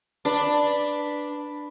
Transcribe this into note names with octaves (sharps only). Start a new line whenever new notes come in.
D4 B4